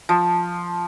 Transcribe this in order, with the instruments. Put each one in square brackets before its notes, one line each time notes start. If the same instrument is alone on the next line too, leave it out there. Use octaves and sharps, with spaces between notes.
[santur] F3